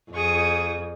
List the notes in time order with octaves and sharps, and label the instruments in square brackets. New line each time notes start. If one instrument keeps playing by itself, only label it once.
[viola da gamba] F2 [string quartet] G#4 C#6 D#6